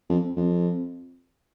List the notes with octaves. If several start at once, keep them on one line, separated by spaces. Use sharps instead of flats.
F2
F2